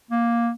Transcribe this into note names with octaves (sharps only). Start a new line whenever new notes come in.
A#3